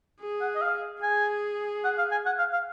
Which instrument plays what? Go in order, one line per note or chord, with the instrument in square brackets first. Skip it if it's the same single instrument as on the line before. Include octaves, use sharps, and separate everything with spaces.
[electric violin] G#4
[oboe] F#5
D#5
F5
[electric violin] G#4 [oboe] G#5
[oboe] F#5
F5
G#5
F#5
F5
F5